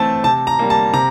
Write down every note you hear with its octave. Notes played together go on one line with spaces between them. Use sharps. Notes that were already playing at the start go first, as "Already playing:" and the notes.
Already playing: E3 A3 C4 A5
C3 A5
A#5
G3 A#3
A5
C3 A#5